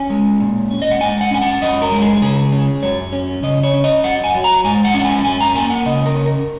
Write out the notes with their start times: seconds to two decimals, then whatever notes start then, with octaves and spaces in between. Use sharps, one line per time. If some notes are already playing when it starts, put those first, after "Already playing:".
Already playing: C#4 G#5
0.10 G#3
0.40 A#2
0.71 C#4
0.82 D#5
0.91 F#5
1.00 G#2 G#5
1.21 F#5
1.31 C#4 G#5
1.41 F#5
1.62 F#2 D#5
1.82 A#4
1.92 G#3
2.02 G#4
2.22 C#3 G#4
2.52 C#4
2.83 F#2 C#5
3.13 C#4
3.43 C#3 D#5
3.63 C#5
3.74 C#4
3.84 D#5
4.04 F#2 F#5
4.24 G#5
4.35 F#3
4.44 A#5
4.64 G#2 G#5
4.85 F#5
4.94 C#4
5.00 F#5
5.05 G#5
5.25 F#2 G#5
5.41 A#5
5.55 A#3 G#5
5.70 F#5
5.86 C#3 D#5
6.06 A#4
6.16 C#4
6.26 A#4